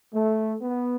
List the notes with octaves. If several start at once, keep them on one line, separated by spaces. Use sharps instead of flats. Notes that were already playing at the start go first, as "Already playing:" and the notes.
A3
B3